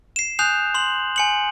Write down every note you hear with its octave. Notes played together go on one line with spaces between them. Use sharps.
C7 E7
G#5 D#6 F#6 G6 C7 F7
C6 F#7
G#5 C#7 F#7